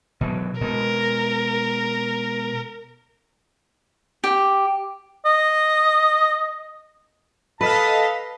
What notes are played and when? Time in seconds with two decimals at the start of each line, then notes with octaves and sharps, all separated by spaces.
0.21 B2 E3 F#3
0.61 B2 G#3 A#4
4.24 G4
5.26 D#5
7.61 A4 B4 D#5 F5 A5 B6